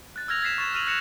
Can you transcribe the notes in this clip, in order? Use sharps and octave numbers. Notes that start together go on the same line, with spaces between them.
F#6 A6
E6 F6 G#6 A#6 F7
G#6 A6 B6 C7 E7
C#6 A6 E7
F6 A#6 D#7 F7 F#7
F#6 A#6 C#7 E7 F7